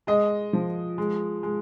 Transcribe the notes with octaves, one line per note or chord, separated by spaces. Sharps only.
G#3 D#5
F3
G#3
G#3